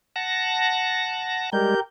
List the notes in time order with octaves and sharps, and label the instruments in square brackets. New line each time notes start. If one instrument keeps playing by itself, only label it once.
[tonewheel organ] F#5 A5 A#6
[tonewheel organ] G3 G#3 [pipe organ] G4 A#4 G6